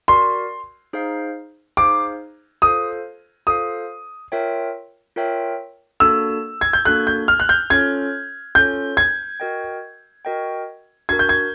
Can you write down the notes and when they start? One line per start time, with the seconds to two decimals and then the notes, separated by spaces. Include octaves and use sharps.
0.08 F#4 A#4 D5 C6
0.93 D#4 G#4 C5 F5
1.77 D#4 G#4 C5 F5 D6
2.62 F4 A4 C5 F5 D#6
3.47 F4 A4 C5 F5 D#6
4.32 F4 A#4 C#5 E5 G5
5.16 F4 A#4 C#5 E5 G5
6.00 A#3 D4 F#4 A4 E6
6.61 G#6
6.73 G6
6.85 A#3 D4 F#4 A4 F#6
7.07 G6
7.28 F6
7.40 F#6
7.49 G6
7.70 C#4 F4 A4 C#5 G#6
8.55 C#4 F4 A4 C#5 G6
8.97 G#6
9.40 F#4 A#4 D#5 G5
10.25 F#4 A#4 D#5 G5
11.09 D4 F#4 A#4 G#6
11.19 G6
11.29 G#6